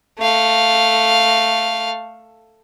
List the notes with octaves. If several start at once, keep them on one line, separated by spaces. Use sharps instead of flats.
A3 F5